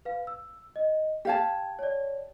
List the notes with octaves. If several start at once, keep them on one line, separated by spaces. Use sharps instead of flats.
B4 F5
E6
D#5
G4 F5 G5 A5 G#6
C#5 D5